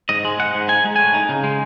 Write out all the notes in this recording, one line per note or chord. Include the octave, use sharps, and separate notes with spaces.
G#2 D#5
G#3
G#2 F#5
G#2
D#4 G#5
G#3
A2 G#5
D#4
C#3
G#3